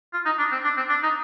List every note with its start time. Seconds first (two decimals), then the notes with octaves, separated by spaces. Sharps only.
0.13 F4
0.26 D#4
0.39 D4
0.52 C4
0.64 D4
0.77 C4
0.89 D4
1.03 D#4